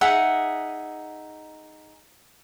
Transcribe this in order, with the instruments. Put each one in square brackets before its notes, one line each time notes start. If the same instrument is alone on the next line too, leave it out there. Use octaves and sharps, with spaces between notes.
[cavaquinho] D#4 G#4 E5 F#5